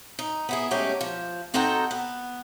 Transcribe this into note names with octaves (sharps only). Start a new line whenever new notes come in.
D#4
B3 E4 G#4
F#3 G#3 A3 C#4 G4
F3
C4 D#4 F#4 A4 G5 A#5
B3